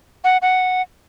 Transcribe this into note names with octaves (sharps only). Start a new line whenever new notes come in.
F#5
F#5